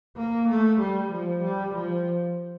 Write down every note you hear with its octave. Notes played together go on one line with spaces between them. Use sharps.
A#3
A3
G3
F3
G3
F3